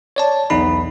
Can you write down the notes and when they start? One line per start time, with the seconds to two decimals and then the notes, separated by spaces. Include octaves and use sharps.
0.16 C#5 D5 A5
0.50 B1 E2 D#4 B5